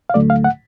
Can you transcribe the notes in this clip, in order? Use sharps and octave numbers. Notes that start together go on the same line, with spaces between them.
F5
D2 D3 F#3 A3 D5
F5
F#5